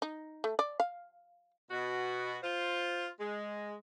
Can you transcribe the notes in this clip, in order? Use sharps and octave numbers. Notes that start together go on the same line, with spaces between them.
D#4
A3
D5
F5
B2 F#4
F4 C5
G#3